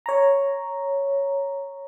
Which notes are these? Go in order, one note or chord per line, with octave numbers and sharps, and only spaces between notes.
C#5 A#5